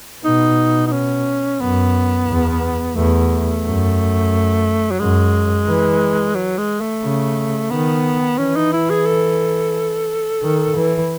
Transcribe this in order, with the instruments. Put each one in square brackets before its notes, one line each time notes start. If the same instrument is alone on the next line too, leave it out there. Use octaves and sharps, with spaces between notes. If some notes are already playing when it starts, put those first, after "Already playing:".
[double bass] B2 [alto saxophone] D#4
[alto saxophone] D#4
C#4
[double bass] F#2 [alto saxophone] B3
[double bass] E2
[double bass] E2 [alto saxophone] A3
[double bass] F#2
[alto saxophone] F#3
[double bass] F#2 [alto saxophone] G#3
[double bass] E3
[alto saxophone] F#3
G#3
A3
[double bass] C#3
[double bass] D#3 [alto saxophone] B3
[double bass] E3 [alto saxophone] C#4
[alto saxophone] D#4
E4
G#4
A4
[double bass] D#3
E3